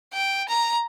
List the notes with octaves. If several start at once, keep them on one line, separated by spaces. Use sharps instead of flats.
G5
A#5